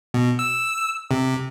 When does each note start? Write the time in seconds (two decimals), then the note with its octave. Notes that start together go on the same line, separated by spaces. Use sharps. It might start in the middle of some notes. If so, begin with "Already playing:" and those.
0.14 B2
0.39 E6
1.11 C3